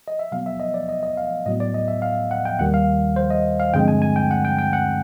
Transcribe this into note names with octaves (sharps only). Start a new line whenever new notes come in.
D#5
E5
B2 F#3 B3 F5
E5
D#5
D5
D#5
D#5
F5
A2 F#3 B3 D#5
D5
D#5
E5
F5
F#5
G5
D#2 D#3 G3 F#5
F5
C5
D#5
F5
G2 D3 F3 G#3 C4 G5
G#5
G#5
G5
F#5
G5
G5
F#5